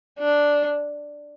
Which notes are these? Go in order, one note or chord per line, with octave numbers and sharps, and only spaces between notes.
D4